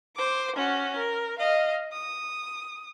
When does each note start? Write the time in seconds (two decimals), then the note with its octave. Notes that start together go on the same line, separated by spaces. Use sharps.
0.16 C5 D6
0.56 C#4 F#4
0.97 A#4
1.39 D#5 F5
1.92 D#6